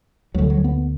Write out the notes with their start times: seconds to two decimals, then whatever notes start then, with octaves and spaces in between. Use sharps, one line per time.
0.34 D2 D3 F#3
0.50 F#3
0.64 B3